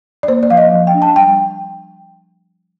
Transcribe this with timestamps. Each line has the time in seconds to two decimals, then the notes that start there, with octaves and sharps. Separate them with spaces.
0.23 D5
0.28 A#3 C5
0.43 D5
0.50 F3 F5
0.57 D#5
0.72 F3
0.87 G5
0.94 D4
1.02 A5
1.16 G3 G5